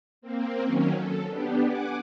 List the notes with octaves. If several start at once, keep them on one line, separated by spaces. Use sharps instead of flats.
A#3 C4
D#3 F#3 C#4
A4
B3 D4 G4
F#5 G#5 D6